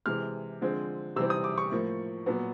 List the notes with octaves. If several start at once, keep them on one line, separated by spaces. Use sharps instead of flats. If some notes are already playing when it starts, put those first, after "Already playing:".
C3 E3 G#3 F6
D3 F3 G#3 C4
C3 E3 G3 C4 E6
D#6
D6
C#6
A2 F3 A#3
A#2 F#3 B3